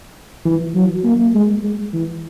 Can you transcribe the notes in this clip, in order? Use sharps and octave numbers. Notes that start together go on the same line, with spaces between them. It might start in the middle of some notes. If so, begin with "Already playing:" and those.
E3
F#3
A#3
G#3
G#3
E3